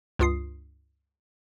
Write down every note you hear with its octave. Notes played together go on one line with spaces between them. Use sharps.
C#2 G2 F4 D#6 C7